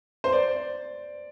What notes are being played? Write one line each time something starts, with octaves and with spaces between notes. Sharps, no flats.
C5
D5